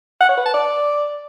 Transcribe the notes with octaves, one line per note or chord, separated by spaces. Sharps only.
F#5
C#5
B4
A5
D5